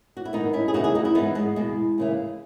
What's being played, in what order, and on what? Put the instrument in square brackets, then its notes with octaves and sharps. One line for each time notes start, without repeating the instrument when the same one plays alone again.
[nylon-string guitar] F#4
E4
G#2 D#3 B3 D#4
C#4 E4
G#4
D#2 C#3 E3 D#4 F#4
E4 G#4
D#4 F#4
C#4 E4
G#2 E3 B3 D#4
G#3 B3
E2 B2 G#3
D#2 C#3 E3